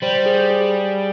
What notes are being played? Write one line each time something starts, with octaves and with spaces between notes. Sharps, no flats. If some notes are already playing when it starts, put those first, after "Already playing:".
G3 C5
G#4
G#4